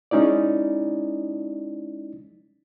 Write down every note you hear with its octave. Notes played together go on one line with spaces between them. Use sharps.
G#3 C#4 D#4 E4 D5